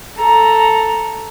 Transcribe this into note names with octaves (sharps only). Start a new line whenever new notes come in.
A4 A#5